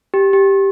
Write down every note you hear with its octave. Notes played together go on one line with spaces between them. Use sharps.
G4
G4